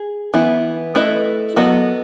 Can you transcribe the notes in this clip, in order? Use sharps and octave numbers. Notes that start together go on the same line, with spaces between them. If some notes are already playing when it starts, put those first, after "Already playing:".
Already playing: G#4
E3 B3 E4
A3 E4 B4 D#5
F#3 B3 F#4 A4 D#5